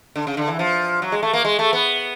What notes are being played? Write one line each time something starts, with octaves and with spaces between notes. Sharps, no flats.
D3
C#3
D3
E3
F3
F#3
G#3
A3
A#3
G#3
A3
B3